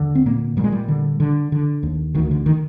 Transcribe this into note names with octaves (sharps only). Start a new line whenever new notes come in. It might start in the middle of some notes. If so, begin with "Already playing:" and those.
Already playing: D#2 D3
C4
A#2 A#3
A#2 G3
G#3
G3
D3
D3
D3
D#2
D2 D#3
D#3
D3
D#3